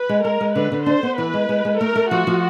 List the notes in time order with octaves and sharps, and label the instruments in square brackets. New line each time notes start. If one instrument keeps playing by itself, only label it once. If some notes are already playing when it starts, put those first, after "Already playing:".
Already playing: [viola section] B4
[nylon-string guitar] G#3
[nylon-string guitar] G#3 [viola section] A#4
[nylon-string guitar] G#3
[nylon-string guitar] D3 [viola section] B4
[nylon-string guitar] D3
[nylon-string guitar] D4 [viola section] C5
[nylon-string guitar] B3
[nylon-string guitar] E3 [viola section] B4
[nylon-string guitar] G#3
G#3
G#3
[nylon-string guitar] A3 [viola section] A#4
[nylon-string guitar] A3
[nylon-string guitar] F3 [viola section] F#4
[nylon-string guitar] F3